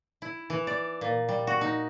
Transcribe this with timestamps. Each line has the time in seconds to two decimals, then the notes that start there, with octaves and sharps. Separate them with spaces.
0.22 E4
0.50 E3
0.67 D5
1.01 A#2
1.29 G3
1.47 F#4
1.61 D#4